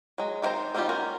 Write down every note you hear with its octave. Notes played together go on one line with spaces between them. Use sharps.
F#3 G#3
D#3 A#3 C4 C5 A#5
D#3 G3 C4 F4 G4
C#4 F#4 A#4